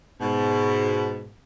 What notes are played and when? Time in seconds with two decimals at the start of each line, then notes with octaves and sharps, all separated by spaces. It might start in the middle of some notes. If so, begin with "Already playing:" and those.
0.20 G#2 B2